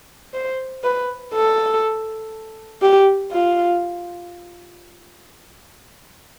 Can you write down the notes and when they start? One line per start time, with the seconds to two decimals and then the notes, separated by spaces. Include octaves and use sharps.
0.34 C5
0.84 B4
1.34 A4
2.82 G4
3.32 F4